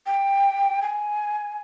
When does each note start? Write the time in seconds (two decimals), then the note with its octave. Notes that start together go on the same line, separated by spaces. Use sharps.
0.06 G5
0.82 G#5